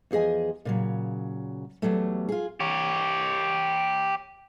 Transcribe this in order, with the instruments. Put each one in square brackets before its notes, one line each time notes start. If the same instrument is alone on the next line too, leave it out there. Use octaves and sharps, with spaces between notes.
[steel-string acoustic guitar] E2 F3 G#4 D#5 G#5
A#2 C#3 F#3
E2 F#3 G3 A3
F4 G#4
[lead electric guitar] G4 C#5